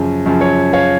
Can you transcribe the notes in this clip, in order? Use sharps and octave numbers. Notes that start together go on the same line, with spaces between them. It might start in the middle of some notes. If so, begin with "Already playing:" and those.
Already playing: F#2 C#3 F3
F#2 C#3 F3
C#5
C#5 F5